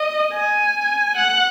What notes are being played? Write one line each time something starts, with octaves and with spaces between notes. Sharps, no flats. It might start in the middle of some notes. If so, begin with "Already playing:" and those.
Already playing: D#5
G#5
F#5